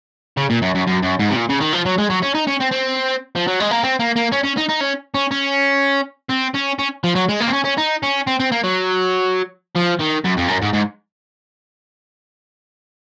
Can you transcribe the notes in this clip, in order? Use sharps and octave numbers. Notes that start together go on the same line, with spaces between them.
C#3
A#2
F#2
F#2
F#2
F#2
G#2
C3
A#2
C#3
D#3
F3
F#3
G#3
F#3
C#4
D#4
C#4
C4
C4
F3
F#3
G#3
A#3
C4
A#3
A#3
C#4
C#4
D#4
D#4
C#4
C#4
C#4
C4
C#4
C#4
F3
F#3
G#3
A#3
C4
C#4
C#4
D#4
C#4
C4
C4
A#3
F#3
F3
D#3
F#2
F2
F#2
G#2
G#2